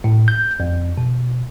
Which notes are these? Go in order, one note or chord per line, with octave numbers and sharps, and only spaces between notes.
A2
G6
F2
B2